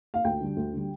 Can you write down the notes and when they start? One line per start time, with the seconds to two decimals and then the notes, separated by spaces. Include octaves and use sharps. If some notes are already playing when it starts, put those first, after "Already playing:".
0.14 F5
0.24 D2 G5
0.40 D3 G3
0.56 D2
0.73 D3 G3